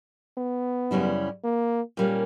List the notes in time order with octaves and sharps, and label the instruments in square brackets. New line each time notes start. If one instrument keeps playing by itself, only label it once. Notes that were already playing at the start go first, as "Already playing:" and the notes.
[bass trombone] B3
[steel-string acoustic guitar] F#2 C#3 G3 C#4 E4
[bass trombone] A#3
[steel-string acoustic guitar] A#2 G3 A#3 C#4